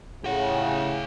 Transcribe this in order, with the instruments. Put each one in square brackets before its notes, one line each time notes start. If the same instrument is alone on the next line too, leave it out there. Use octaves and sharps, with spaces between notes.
[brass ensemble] A2 C#3 [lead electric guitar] G4 F#5